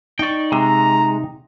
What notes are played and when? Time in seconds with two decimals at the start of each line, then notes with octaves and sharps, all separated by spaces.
0.19 D#4 D5 G5 C#6
0.52 C3 G#3 A#5